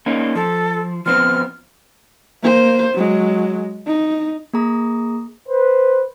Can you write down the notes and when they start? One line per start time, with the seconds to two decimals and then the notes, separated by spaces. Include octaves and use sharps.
0.06 A#3 C#4 D#4
0.35 F3 A4
1.06 F3 B3 C4 F6
2.43 A#3 C5
2.94 F#3 G#3
3.86 D#4
4.53 A#3 G#4 A#5 D#6
5.48 B4 C5